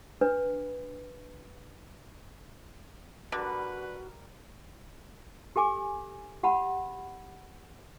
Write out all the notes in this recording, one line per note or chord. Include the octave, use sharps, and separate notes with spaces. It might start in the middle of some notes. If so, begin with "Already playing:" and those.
D4 B4
D3 G3 F#4 A#4 B4
G4 A4 G#5 D6
G4 F#5 A5 B5